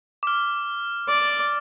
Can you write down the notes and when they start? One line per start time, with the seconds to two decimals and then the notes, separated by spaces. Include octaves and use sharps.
0.23 D6 F6
1.08 D5